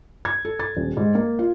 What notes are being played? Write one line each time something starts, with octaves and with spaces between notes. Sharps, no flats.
G#6
A4
A6
D#1
G#2
A#3
F4